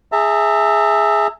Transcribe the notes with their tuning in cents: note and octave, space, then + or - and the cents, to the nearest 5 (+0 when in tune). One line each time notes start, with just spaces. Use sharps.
G#4 +0 E5 +0 A#5 -45